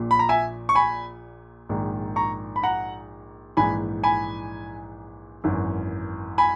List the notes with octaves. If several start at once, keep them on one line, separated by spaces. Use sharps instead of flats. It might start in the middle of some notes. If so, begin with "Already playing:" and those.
Already playing: A#1 A#2
B5
A#5
E5 G#5
C#6
G#5 B5
A#1 G#2 D#3
A#5 C#6
B5
F#5 A#5
A#1 G#2 E3 G#5 B5
G#5 B5
G#1 F#2 E3
G#5 B5